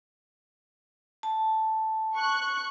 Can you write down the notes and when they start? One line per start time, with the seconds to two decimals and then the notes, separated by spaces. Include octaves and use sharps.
1.23 A5
2.14 C#6 F#6